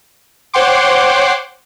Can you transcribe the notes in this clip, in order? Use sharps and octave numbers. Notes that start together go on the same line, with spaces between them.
C5 C#5 F#5 G5 C6 D6